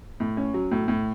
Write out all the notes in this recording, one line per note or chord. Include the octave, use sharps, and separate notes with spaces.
A2
C#4
F#3
A2
A2